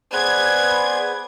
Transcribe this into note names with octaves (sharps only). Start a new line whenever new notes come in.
B3 G#4 B4 C5 D5 G#6